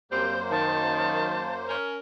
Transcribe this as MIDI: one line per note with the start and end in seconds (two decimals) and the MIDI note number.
0.11 1.76 42
0.11 0.39 55
0.11 1.76 58
0.11 0.39 60
0.11 1.76 72
0.11 0.40 91
0.51 1.45 51
0.51 1.54 81
1.69 1.99 61
1.69 1.99 70